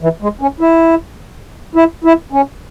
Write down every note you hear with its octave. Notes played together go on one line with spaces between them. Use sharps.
E3
G#3
C#4
E4
E4
E4
C#4